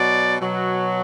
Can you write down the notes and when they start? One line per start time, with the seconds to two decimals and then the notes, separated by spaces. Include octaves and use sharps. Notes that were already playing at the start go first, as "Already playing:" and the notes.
Already playing: B2 F#3 D5
0.41 B2 F#3